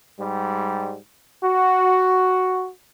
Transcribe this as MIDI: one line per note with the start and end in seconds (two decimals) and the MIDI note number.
0.19 0.97 44
0.19 0.97 55
1.43 2.69 66